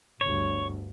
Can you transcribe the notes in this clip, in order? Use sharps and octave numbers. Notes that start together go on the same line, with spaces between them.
G1 D2 G2 C#5